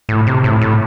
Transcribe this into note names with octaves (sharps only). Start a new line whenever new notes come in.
A2
C3
A2
A2